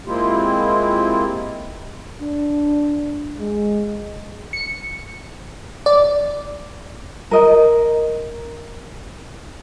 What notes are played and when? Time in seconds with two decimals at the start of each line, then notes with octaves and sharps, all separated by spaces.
0.06 G#3 A#3 C4 E4 F4 G4
2.21 D4
3.39 G#3
4.53 C#7
5.86 D5
7.31 A#4 D#5